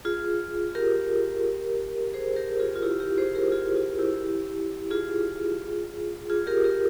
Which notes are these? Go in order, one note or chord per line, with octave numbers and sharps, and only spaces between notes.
F4 G#4
G4 A#4
G#4 C5
G4 A#4
F4 G#4
F4
E4 G4
G4 A#4
G#4 C5
G4 A#4
F4 G#4
F4
E4 G4
F4 G#4
F4 G#4
G4 A#4
G4 A#4